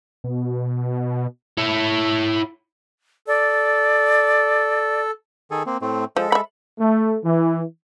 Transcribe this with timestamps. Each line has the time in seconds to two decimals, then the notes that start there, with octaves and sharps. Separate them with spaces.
0.24 B2
1.57 E4 C#5
3.28 A4 D5
5.51 D#3 G#4 A4
5.66 A#3 C4
5.82 A2 A3 C4
6.16 F3 G#3 A4
6.32 E5 B5
6.79 A3
7.24 E3